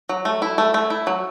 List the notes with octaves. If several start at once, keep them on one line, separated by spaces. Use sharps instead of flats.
F#3
A3
E4
A3
A3
E4
F#3